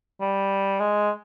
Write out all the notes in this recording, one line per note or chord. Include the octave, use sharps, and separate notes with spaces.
G3
G#3